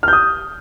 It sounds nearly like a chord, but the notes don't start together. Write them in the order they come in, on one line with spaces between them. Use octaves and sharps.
F6 G6 D#6